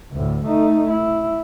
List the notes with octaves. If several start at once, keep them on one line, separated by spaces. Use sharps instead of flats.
D2 A2
A3 D#4
E4